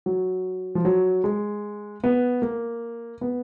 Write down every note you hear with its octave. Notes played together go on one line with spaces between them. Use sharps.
F#3
F3
F#3
G#3
B3
A#3
B3